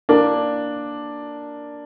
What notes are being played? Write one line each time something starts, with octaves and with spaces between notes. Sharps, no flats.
A#3 D4